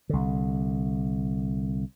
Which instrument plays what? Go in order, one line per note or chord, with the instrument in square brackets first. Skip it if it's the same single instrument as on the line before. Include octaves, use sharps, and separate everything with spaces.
[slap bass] C2 D3